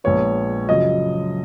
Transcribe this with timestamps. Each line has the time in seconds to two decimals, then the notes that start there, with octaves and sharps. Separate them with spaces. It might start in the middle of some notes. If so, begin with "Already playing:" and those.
0.04 A#1 A#2 G#3 B3 C#5
0.68 F#2 C#3 F3 D#5